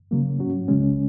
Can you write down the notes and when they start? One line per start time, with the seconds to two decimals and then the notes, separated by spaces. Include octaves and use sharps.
0.11 C#3 F#3 A#3
0.39 G#2 F#3 C#4 F#4
0.68 C#2 C#3 G#3 C#4